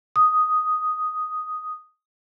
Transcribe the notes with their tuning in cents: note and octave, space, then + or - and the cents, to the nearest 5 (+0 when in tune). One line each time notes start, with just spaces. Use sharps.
D#6 +0